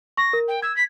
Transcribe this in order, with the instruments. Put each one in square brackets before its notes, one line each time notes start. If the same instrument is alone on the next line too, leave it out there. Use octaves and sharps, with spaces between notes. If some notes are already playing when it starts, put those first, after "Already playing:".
[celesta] C#6 [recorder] A#6
[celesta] A#4
[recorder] G5
[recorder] E6 [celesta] G#6
[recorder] B6